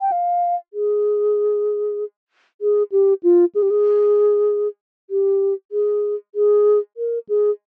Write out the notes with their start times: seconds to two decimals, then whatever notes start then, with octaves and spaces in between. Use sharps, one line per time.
0.01 G5
0.12 F5
0.73 G#4
2.61 G#4
2.92 G4
3.23 F4
3.55 G#4
3.62 G4
3.70 G#4
5.10 G4
5.72 G#4
6.35 G#4
6.97 A#4
7.29 G#4